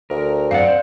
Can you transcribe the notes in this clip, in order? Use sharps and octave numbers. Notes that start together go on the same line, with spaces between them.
D2 A#4
F#2 C4 D5 F5 F#5
C5